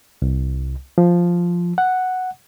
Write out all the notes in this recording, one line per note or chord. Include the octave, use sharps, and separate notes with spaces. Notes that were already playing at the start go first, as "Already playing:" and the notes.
C2
F3
F#5